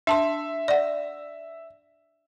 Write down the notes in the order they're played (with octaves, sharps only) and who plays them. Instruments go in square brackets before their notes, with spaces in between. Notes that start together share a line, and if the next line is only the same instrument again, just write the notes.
[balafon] D4 A5 C6 [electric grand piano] E5
[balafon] D5 F#5